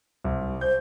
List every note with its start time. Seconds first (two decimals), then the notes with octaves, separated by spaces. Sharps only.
0.24 C2
0.61 C5 G6